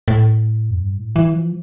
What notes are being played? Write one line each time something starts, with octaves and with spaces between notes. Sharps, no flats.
A2
F2
G2
A2
E3
F3